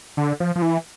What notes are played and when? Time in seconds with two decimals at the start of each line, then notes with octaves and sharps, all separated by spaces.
0.17 D3
0.40 F3
0.56 F3
0.62 E3